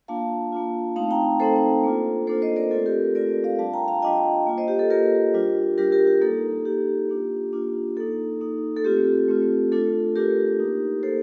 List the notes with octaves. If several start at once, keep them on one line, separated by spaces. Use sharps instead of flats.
A#3 D4 F4 F5 A5
A#3 D4 F4
A3 C4 D#4 F5 A5
G5 A#5
A3 C4 D#4 A4 C5
A#3 D4 F4
A#3 D4 F4 A4 C5
C5 D#5
A#4 D5
A3 C4 F4 A4
G4 A#4
A3 C4 F4 A#4 D5
D5 F5
G3 D4 F4 F5 A5
G5 A#5
F5 A5
G3 D4 F4 D#5 G5
A#3 F4
C5 D#5
G4
A4
A#3 F4 G4 A#4
G3 D4 F4
G3 D4 F4 G4 A#4
G4 A#4
G4
A#3 D#4 A4
A#3 D#4 G4
A#3 D4 F4
A#3 D4 F4
A#3 D#4 A4
A#3 D#4
A4
A3 C4 F4 G4
A3 C4 F4
A3 D4 F4 A4
A3 D4 F4 G4 A#4
A#3 D#4
A#3 D#4 A4 C5